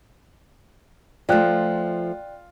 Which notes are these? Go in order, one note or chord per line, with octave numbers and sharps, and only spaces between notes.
F3 A3 F4 D5 G5 F#6